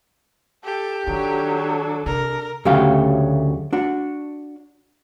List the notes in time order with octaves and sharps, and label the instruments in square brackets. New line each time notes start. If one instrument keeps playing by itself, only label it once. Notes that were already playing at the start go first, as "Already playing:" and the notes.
[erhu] G4 [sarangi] A4
[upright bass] D#3 [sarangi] F#3 [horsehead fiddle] D4 A4
[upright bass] C3 [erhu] A#4
[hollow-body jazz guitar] D2 C#3 F#3 A3 G4 F5
D4 F#4